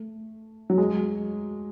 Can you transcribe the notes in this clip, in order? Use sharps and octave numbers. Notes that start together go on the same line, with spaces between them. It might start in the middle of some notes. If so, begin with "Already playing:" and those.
Already playing: A3
F#3
G#3